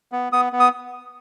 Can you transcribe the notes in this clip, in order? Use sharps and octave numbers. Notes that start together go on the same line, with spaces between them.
B3
B3 D#6
B3
D#6